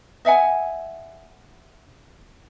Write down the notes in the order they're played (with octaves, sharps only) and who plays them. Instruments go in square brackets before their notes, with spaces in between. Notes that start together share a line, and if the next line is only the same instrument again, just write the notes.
[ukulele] D#5 E5 F#5 G#5